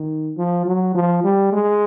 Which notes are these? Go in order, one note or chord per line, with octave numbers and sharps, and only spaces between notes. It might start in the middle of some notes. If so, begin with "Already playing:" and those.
Already playing: D#3
F3
F#3
F3
G3
G#3